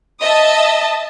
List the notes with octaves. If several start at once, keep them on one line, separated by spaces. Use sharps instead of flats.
D#5 E5 A5 D#6